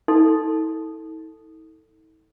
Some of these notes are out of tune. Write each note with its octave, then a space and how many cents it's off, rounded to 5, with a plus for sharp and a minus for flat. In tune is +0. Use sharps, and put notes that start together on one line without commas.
D#4 +45 A4 +15